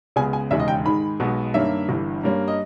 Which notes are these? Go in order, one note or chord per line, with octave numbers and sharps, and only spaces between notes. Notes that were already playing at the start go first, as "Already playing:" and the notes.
C#2 C#3 G#3 B3 G#5
G#5
E1 D#2 C#3 G#3 E5
D#5
G5
G#2 D#3 G#3 B5
B1 B2 G#3 B3
G2 D#3 A#3 C#4 E5
G1 G2 E3
G2 G3 A#3 C#4
D#5